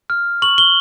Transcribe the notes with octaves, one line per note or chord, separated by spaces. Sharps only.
F6
C#6 F#7
G7